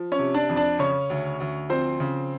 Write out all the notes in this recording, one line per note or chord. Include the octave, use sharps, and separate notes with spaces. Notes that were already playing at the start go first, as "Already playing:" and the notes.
Already playing: F3
C#4 C#5
C3
D4 D5
F2
D4 D5
C#3 C#4 C#5
D2
D2
F3 C4 C5
C#3